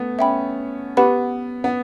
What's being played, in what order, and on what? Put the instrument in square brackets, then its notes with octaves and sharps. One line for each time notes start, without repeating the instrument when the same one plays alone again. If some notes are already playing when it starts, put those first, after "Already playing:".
Already playing: [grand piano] A3 B3
[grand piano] C#4 [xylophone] E5 G5 B5
[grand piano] B3 [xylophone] G4 B4 F#5 B5
[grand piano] B3